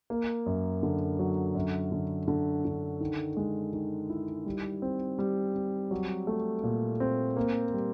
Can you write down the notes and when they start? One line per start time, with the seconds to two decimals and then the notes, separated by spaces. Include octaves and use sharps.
0.10 A#3
0.46 F#2
0.83 D3
1.19 F#3
1.55 F#2
1.92 D3
2.28 D3
2.65 D3
3.01 D#3
3.37 G#3
3.73 D#3
4.10 E4
4.46 G3
4.82 C4
5.19 G3
5.55 C4
5.91 F#3
6.27 A3
6.63 A#2
7.00 C4
7.37 A#3
7.73 G3